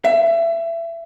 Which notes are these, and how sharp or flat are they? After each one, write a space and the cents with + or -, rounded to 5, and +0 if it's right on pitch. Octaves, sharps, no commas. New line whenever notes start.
E5 +25